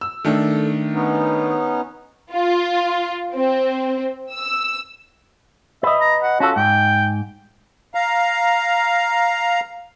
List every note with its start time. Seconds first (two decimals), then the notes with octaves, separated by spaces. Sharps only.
0.01 E6
0.25 D#3 A3 D4 A4
0.93 B3 C#4 D#4
2.32 F4
3.35 C4
4.32 E6
5.83 B4 D#5 E5
6.01 A#5
6.23 F#5
6.40 C#4 F4 F#4 A4
6.56 G#2 G5
7.95 F5 A#5